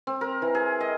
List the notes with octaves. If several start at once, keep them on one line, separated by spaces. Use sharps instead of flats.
C4
A#4
E3
G#4
D#5